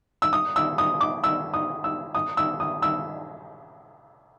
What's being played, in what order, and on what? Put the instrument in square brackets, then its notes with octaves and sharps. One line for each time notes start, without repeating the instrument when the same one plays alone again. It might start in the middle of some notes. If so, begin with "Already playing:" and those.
[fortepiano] E6
D#6
E6
D#6
D6
E6
D#6
E6
D#6
E6
D#6
E6